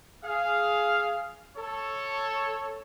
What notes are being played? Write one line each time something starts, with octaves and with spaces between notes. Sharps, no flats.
G#4 F5
A4 C#5